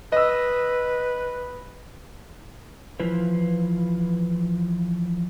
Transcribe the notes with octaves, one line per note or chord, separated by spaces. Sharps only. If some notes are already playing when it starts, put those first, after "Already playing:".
B4 D#5 E6
E3 F3 E4 F4 B4